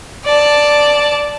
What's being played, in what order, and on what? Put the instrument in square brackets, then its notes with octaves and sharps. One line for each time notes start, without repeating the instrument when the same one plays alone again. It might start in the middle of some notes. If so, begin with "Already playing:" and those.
[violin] D5 A5